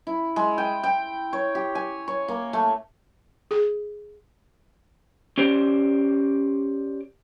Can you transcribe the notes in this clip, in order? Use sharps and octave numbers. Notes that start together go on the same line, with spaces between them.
E4
G#3
G5
G5
C#5
G4
G#5
C#5
A#3
A3
G#4
C#4 G4 C5 D5